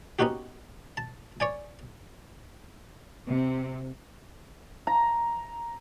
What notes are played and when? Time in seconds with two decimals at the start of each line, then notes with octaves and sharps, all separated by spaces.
0.19 B3 C#4 D#4 F#4 G4
0.97 A5
1.40 C#5 D5 G#5
3.28 C3
4.87 A#5